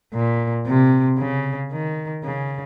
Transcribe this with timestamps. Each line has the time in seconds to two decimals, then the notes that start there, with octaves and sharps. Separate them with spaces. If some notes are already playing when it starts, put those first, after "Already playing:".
0.13 A#2
0.66 C3
1.18 C#3
1.72 D#3
2.25 C#3